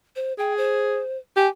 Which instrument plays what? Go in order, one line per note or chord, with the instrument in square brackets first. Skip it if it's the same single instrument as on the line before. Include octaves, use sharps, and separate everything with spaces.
[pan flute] C5
[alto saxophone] G#4 [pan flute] G5
[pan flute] C5
[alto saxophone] G4 [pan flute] G#5